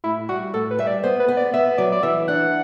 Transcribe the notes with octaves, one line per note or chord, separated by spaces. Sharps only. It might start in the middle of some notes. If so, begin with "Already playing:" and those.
A2 E4
G3 F#4
A2 A4
B4
G3 E5
D5
B3 C5
B4
B3
D5
B3 E5
F#3 D5
D5
E3 E5
D4 F#5